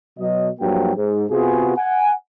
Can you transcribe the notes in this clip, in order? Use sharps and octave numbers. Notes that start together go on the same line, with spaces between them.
B2 F#3 D#5
G2 F3 F#3 A#3 F#4 G5
G#2
C3 B3 F4 F#4 G#4
F#5 G#5